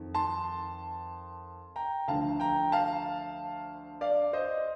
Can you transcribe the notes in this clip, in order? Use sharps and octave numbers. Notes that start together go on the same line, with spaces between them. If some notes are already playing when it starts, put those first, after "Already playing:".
Already playing: F2 D#3
A5 C6
G5 A#5
D2 D3 F3 F5 A5
G5 A#5
F5 A5
D5 F5
C5 D#5